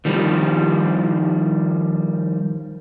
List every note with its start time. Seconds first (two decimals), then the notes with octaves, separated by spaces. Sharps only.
0.05 D#3 F3 G3